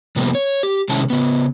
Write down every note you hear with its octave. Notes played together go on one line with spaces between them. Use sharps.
C3 F3 G3 A#3 B3
C#5
G4
C3 D#3 G#3 C#4 E4 A5
C#3 B3